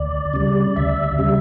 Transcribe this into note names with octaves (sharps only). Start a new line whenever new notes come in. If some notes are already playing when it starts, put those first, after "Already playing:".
Already playing: D2 D5
C#3 G3
D2 E5
C#3 G3 E5